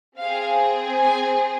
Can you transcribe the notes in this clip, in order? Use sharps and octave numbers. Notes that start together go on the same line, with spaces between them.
C4 G#4 F5
G#5